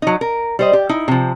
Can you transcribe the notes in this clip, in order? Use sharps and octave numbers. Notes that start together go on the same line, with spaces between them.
F#3 D#4
A#4
G3 C5 D#5
G4
D#4 E4
C3 F3